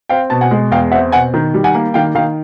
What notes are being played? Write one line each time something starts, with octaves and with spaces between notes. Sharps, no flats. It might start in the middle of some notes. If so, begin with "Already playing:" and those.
C4 F5 G5
B2 A5
F#5 G#5
G#3
E2 F5 G5
C4 E5 F#5
B2 F#5 G#5
D#3
G3
F#5 G#5
A#3
D#3 F5 G5
D#3 F5 G5